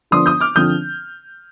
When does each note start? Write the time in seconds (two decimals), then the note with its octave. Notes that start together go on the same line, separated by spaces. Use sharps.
0.11 D3 F3 B3 D4 C6 D#6
0.26 D#6 G6
0.41 D6 F6
0.55 D3 F3 C4 D#6 G6